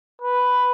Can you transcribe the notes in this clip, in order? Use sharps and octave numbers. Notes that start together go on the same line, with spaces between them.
B4